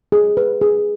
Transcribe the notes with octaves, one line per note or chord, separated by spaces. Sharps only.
G#4
B4
G#4